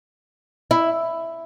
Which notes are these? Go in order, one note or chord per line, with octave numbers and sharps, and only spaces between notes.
E4